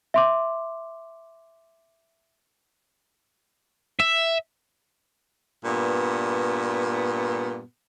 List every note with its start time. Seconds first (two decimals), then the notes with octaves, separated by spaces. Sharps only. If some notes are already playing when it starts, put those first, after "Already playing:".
0.14 E5 C6 D6
4.00 E5
5.65 G2 A#2 B3